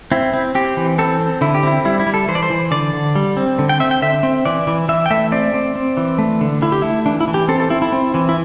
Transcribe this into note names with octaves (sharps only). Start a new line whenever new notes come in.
C4 E4
C4
C4 G4
E3
C4 A4
C4
D3 E4
G4
C4 E4
G3 E4
E4
G3
A4
E3 C5
D5
C5
E3
D3 D5
D3
G3
C4
D3
G5
C4 E5
G5
D3 E5
C4
E3 D5
E3
E3 E5
G5
A3 E5
C4 D5
C4
C4
E3
A3
D3
D3 E4
G4
A3 E4
E3 D4
E4
E3
G4
C4 A4
A4
C4 E4
E4
C4
E3
E4